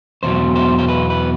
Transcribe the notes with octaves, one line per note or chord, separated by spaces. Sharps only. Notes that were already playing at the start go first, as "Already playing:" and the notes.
E2 B2 F#3 C5
C5
C5
B4
B4